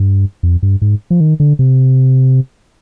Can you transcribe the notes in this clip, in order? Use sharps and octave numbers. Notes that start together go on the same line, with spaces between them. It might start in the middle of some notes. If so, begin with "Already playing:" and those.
Already playing: G2
F2
G2
G#2
F3
D#3
D3
C3